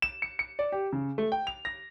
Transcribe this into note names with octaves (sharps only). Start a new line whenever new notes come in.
E7
C#7
C#7
D5
G4
C#3
A3
G5
F7
A#6